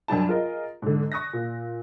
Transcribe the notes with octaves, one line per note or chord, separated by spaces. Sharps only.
F#2 G3 D4 A5
F4 G#4 A#4 D#5
G#2 D3
C#6 D#6 F#6 A#6
A#2